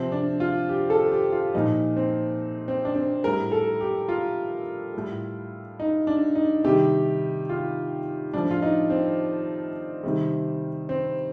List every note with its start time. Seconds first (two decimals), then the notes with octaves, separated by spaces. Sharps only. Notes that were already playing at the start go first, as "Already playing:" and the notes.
Already playing: C3 F3 C4
0.12 D4
0.40 F4
0.69 G4
0.90 A4
1.12 G4
1.32 F4
1.54 A#2 F3 D#4
1.97 C4
2.68 C4
2.85 D4
2.96 C4
3.24 A2 G3 A#4
3.52 A4
3.81 G4
4.09 F4
4.94 A2 G3
5.80 D#4
6.07 D4
6.35 D#4
6.64 C3 D#3 G3 G4
7.49 F4
8.33 A2 F3 D4
8.51 F4
8.62 D#4
8.90 C4
10.03 C3 D#3 G3
10.89 C4